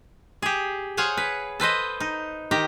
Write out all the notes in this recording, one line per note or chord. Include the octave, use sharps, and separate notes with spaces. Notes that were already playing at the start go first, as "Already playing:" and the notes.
G4 G#4
G#4 C5 C#5 F5 F#5 G#5
B4
A4 B4 C5 D#5
D#4
D#3 G4 A#5